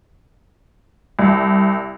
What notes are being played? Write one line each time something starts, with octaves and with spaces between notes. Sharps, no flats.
C2